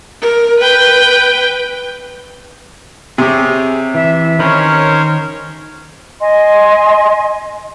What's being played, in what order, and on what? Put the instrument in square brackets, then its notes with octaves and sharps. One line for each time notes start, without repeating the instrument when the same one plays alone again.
[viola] A#4
B4 G5
[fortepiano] C3 G4 [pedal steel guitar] G#4 C#5
[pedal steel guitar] E3 [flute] E5
[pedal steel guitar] D#3 D#5 B5 [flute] C#4 [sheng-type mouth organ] A#4 C5 C#5
[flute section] D#5 G#5 C6